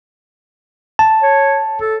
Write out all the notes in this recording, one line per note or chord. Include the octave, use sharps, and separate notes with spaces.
A5
C#5
A4